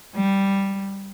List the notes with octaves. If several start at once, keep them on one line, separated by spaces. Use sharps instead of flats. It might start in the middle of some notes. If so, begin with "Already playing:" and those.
G3